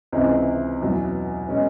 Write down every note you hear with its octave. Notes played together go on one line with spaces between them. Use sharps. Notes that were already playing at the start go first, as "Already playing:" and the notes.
C#2 C3 E3 G#3 C4
E2 B2 F#3
B2 G#3 C#4